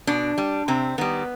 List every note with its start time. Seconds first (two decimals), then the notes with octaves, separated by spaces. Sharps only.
0.07 B2 D4
0.38 G3
0.68 C3 C4
0.98 D#3 G3 B3